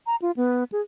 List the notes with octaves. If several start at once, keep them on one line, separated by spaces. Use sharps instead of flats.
A#5
F4
B3
G#4